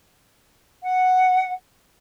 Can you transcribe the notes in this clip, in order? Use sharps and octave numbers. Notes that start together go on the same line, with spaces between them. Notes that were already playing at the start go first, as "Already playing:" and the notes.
F#5